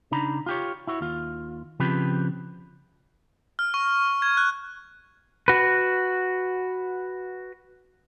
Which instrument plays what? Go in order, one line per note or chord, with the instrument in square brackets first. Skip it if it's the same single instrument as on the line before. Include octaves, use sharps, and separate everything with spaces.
[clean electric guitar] C#3 D4 D#4 A#5 B5
F4 G4 C#5
E4 F#4 C#5
D#2 F4
C#3 F3 C4 G4 B4
[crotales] F6
C#6
G#6
F#6
[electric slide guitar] F#4 B4